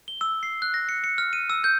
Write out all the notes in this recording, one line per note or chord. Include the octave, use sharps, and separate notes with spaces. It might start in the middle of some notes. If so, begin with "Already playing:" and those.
G7
E6
C7
F#6
A#6
C#7
C#7
F6
D#7
E6
G6